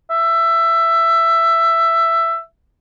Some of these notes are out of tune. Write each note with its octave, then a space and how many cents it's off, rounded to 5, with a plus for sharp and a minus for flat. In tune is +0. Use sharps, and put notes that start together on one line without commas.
E5 +15